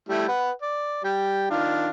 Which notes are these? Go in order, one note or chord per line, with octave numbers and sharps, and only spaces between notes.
G3 A3 E4
B4 F#5
D5
G3 G5
D#3 D4 F4